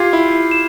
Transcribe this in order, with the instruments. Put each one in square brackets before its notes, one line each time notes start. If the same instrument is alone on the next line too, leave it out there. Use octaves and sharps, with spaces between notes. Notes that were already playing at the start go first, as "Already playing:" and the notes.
Already playing: [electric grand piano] F4 G4 [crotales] G#6 C7
[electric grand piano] E4
[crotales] E7